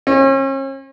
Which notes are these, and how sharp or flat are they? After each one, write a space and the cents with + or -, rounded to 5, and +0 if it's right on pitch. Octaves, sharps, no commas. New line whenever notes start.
C#4 -40